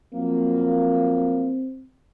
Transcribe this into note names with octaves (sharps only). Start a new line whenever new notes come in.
F3 F#3 A#3 C4